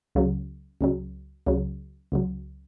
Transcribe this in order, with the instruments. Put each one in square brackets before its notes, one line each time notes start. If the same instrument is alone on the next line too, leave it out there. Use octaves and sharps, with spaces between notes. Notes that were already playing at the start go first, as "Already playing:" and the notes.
[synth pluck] C#2 C#3 F#3
C#2 C#3 F#3
C#2 C#3 F#3
C#2 C#3 F#3